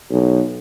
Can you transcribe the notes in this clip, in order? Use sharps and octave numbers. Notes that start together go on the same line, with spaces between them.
B1